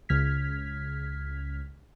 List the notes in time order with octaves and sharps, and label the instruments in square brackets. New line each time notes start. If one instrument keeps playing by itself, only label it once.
[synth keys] C#2 C#3 F6 G#6 B6